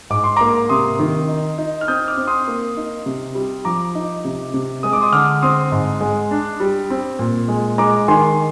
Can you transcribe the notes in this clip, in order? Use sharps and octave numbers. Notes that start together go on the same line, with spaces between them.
G#2 D6
C6
A#3 A#5 D6
C3 C6 D#6
D#3
D#4
D#4
F6
C4 D#6 G6
D6 F6
C4
C6 D#6
A#3
D#4
C3
G3
F3 A#5 D6
D#4
C3
C3
G#3 D#6
D6
C6 D#6
D3 D6 F6
C4 C6 D#6
G#2
G#3
D4
G3
C4
A#2
G#3
G#3 A#5 D6
D#3 G#5 C6